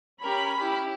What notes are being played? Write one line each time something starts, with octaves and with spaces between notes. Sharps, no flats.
C#4 G4 A#4 B5
E4 G4